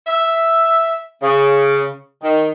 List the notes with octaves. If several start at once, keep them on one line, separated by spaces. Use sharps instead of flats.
E5
C#3
D#3